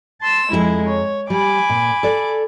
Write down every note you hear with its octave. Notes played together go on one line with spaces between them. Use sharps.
A5 C6 E6
F2 G#3 E4 G4 A#5
C#5
G3 G#5 B5 D6
A#2
A4 D5